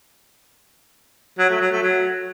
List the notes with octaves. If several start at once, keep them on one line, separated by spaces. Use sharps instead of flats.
F#3
A3
F#3
A3
F#3